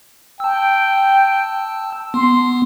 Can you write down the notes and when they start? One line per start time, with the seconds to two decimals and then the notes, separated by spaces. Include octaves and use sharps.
0.40 G5 A5 E6
2.14 B3 C6